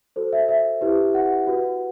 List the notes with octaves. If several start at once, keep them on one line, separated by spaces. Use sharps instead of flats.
F#4 A4 C5
E5
E5
E4 G4 B4
F#5
F#4 B4